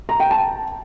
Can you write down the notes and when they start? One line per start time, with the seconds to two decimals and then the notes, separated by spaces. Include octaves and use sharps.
0.09 A#5
0.20 G5
0.31 A5